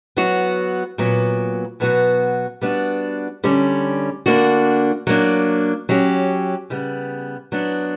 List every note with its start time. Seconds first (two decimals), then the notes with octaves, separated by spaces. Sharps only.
0.17 F#3 B3 F#4
0.98 A#2 F#3 B3
1.80 B2 F#3 B3 F#4
2.62 G3 B3 D4 F#4
3.44 D3 G3 C#4
4.26 D3 A#3 D4 F#4
5.07 F#3 A#3 D4
5.89 F#3 C#4 G4
6.70 C#3 G3 B3
7.52 F#3 B3 D4